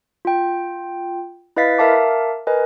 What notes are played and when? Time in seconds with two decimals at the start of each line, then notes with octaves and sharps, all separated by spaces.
0.25 F4 G5
1.57 E4 B4 D#5 F5 A6 B6
1.78 A#4 E5 F5 A5 D6
2.47 A#4 B4 D#5 G#5